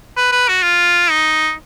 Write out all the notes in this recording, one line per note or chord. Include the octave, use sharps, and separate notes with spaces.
B4
B4
F#4
F4
D#4